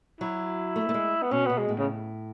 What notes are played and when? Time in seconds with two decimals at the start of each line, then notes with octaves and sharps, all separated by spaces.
0.20 F#3 E4
0.76 A3
0.89 A3
0.94 G#3
1.22 B3
1.31 B2 C#4
1.46 B2 B3
1.58 G#3
1.68 A2
1.78 C#3